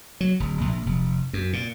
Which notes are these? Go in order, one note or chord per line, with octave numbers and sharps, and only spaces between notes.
F#3
D1
A#1
F1
F#2
A#2